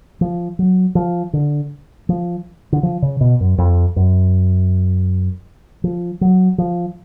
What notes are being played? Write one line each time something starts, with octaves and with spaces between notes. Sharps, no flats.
F3
F#3
F3
D3
F3
D3
F3
C#3
B2
F#2
F2
F#2
F3
F#3
F3